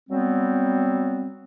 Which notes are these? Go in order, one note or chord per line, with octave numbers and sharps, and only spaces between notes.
F#3 G3 B3 C4